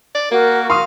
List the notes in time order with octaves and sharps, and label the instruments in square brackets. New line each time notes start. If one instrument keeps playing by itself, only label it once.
[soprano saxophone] D5
[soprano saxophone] A#3 [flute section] F#4 A#4
[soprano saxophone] F5 [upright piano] C6 C#6 D#6